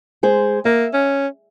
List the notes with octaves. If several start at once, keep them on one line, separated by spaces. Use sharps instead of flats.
G#3 G#4 C5
A#3 E5
C#4